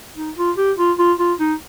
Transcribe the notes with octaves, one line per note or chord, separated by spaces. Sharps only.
D#4
F4
G4
F4
F4
F4
D#4